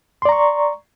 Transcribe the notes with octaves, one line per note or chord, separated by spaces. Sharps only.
D5 A#5 C6 C#6